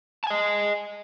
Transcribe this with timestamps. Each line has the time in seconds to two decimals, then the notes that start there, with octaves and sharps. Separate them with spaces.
0.24 A5
0.27 G#5
0.30 D#5